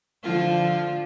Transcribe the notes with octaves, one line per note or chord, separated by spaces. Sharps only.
D3 F3 F4